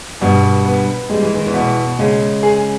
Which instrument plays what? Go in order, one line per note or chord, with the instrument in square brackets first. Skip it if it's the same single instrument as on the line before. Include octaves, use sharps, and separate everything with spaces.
[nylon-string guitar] G2 G3 [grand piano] B2
[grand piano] B3
[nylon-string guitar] G3 [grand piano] G#3
[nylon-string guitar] E3
D#3
E2 E3
[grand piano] B2
[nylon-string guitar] C#3 [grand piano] G#3
[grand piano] G#4